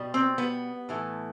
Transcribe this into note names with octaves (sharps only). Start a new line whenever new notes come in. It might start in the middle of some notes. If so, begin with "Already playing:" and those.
Already playing: B2 G3
C4
B3
A2 E3 A3